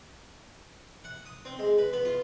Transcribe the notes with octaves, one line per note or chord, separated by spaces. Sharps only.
F#5
D#6
C4
G#3
B4
B3
F4